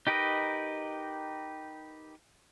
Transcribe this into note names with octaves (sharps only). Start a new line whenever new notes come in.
D#4 G4 A#4 B4 D#5